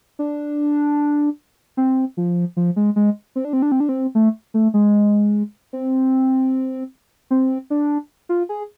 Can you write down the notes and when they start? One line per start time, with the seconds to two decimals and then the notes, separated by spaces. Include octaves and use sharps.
0.19 D4
1.77 C4
2.17 F3
2.57 F3
2.76 G#3
2.96 G#3
3.36 C4
3.45 D4
3.53 C4
3.62 D4
3.72 C4
3.80 D4
3.89 C4
4.15 A3
4.54 A3
4.74 G#3
5.73 C4
7.31 C4
7.70 D4
8.29 F4
8.49 G#4